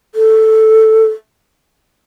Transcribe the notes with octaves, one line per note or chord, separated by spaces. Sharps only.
A4